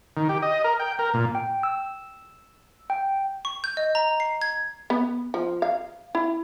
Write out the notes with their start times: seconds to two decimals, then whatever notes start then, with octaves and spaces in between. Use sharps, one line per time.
0.17 D#3
0.29 G4
0.42 D#5
0.64 A#4
0.80 G5
0.99 A#4
1.14 A#2
1.35 G5
1.63 E6
2.90 G5
3.45 C#6
3.64 G6
3.77 D#5
3.95 A#5
4.20 C7
4.42 G#6
4.90 B3
5.34 F3
5.62 F5
6.15 E4